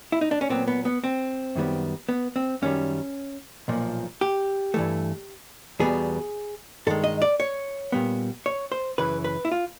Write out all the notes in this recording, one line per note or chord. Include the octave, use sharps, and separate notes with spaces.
E4
D#4
D4
C#4
A#2 F#3 B3 C4
B3
B3
C4
F#2 D#3 G3 B3
B3
C4
F#2 D#3 G3 C#4
B1 A#2 F3
G4
G2 E3 A3
E2 B2 G3 B3 G#4
G2 D#3 G#3 A4
D#5
D5
C#5
A#2 G3 B3
C#5
C5
F#2 C#3 E3 B4
B4
E4
F4